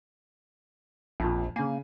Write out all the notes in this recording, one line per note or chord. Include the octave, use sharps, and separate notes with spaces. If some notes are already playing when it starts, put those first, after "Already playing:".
A#1 F2 A#2
C#3 A#3 G#5